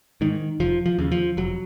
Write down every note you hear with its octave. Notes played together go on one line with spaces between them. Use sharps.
G#2 D#3
F1 F3
F3
D#2 C#3
F3
F1 F#3